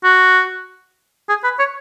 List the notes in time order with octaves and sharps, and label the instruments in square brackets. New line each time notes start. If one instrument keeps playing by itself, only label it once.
[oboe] F#4
G#4
B4
C#5